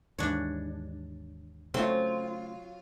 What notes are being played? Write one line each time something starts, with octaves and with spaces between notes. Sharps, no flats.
D#2 G#2 E3 D4 C#5
C#3 F#3 A3 C4 F4